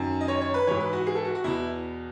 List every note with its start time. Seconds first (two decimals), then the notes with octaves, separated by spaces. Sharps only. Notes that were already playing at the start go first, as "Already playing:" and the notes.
Already playing: F#2 D#3
0.21 D#5
0.28 C#5
0.41 C#5
0.54 B4
0.67 G#2 E3 C#5
0.80 B4
0.93 F#4
1.07 G#4
1.15 A4
1.25 F#4
1.35 F#4
1.44 E2 B2 E4